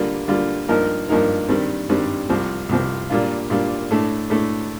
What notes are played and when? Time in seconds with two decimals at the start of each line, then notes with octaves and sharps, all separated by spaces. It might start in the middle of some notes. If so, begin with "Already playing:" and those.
Already playing: D3 G3 A#3 F4
0.28 D3 G3 A#3 F4
0.68 G2 F3 A#3 D#4 A#4
1.09 G2 F3 A#3 D#4 A#4
1.49 G2 D#3 G3 C4
1.89 G2 D#3 G3 C4
2.29 C2 C3 F3 C4
2.69 C2 C3 F3 C4
3.10 A#2 G3 A#3 D4 F4
3.50 A#2 G3 A#3 D4 F4
3.91 A2 A3 D4
4.30 A2 A3 D4